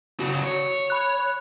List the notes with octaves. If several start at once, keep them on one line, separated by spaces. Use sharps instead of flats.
C#3 F#4
C#5
B5 F#6